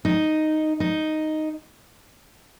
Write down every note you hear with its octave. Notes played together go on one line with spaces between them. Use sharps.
D#4
D#4